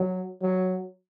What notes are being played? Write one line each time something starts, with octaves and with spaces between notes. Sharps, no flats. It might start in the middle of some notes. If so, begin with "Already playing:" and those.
Already playing: F#3
F#3